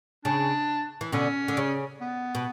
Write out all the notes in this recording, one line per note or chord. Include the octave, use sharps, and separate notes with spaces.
C#3 D4
E3
B2 D3 C#4
D3
C#3
B3
B2